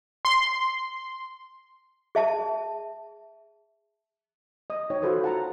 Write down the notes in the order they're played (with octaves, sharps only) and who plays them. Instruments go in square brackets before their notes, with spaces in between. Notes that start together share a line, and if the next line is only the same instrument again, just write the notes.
[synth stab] C6
[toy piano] G#4 E5 A5
[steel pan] D#5 D#6
D#4 C#5 G5
F4 F#4 A4 B4 C5 D#6
F#5 A5 A#5